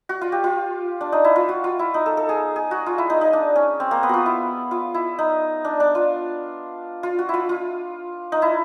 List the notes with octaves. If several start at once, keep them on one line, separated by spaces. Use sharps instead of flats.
F#4
F4
G4
F4
D4
D#4
E4
F4
F#4
F4
E4
D#4
A4
A4
G#4
G#4
F#4
F4
E4
D#4
D#4
D4
C#4
C4
A#3
B3
F4 F#4
E4
F4
E4
D#4
D4
D4
F4
F4
F#4
E4 F4
F4
D#4
E4